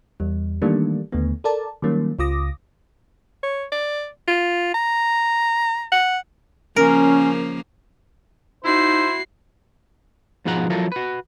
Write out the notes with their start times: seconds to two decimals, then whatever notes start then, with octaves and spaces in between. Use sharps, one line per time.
0.20 E2 G3
0.62 D#3 E3 G3 A3 A#3 D4
1.12 D#2 D3 A3 B3
1.44 A4 A#4 D5 A5
1.82 D#3 F#3 G3 A#3 C#4
2.19 C#2 C#3 F4 D6 D#6 A#6
3.43 C#5
3.72 D5
4.28 F4
4.74 A#5
5.92 F#5
6.76 C#3 F3 A#3 C#4 A#4
8.64 D#4 E4 F#4 C5 C7
10.45 G#2 B2 F3 G#3 F#5 A#5
10.70 F3 F#3 E4 F4 A4 A#4
10.92 F#4 B4